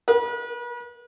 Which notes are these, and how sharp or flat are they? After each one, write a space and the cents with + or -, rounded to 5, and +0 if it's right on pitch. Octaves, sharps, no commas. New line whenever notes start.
B4 -40